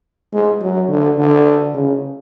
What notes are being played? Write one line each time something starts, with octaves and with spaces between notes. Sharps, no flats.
G#3
F#3
D3
D3
C#3